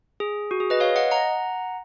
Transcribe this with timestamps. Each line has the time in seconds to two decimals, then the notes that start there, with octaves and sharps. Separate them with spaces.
0.20 G#4
0.51 F#4
0.60 G#4
0.70 B4 D#5
0.80 C#5 F5
0.96 D#5 F#5
1.11 F#5 A#5